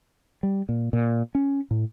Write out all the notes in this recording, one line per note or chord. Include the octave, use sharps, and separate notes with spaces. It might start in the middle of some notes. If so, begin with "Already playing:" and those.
G3
A#2
A#2
C#4
A2